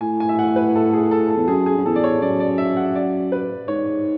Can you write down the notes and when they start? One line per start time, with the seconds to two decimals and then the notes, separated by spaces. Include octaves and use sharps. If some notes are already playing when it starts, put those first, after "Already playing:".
0.01 A2 G#5
0.20 G#5
0.29 E5
0.39 F#5
0.56 B4
0.75 A4
0.93 G#4
1.11 A4
1.30 A4
1.37 E2
1.48 F#2 G#4
1.66 G#4
1.77 F#2
1.85 E2 A4
1.96 D5
2.04 C#5
2.22 F#2 D5
2.40 D5
2.58 E5
2.77 F#5
2.95 D5
3.32 B4
3.68 G#2 C#5